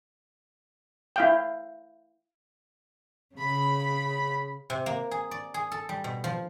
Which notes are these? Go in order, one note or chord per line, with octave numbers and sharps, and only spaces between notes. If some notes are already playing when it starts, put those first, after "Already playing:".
E4 F5 G5
C#3 B5
C3
A#3
G#4
D5
G#4
A4
G3
B2
F3